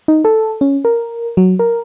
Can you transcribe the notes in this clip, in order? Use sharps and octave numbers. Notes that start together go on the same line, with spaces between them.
D#4
A4
C#4
A#4
F#3
A#4